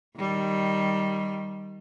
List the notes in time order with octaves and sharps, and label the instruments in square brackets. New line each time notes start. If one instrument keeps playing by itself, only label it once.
[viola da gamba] D#3 G3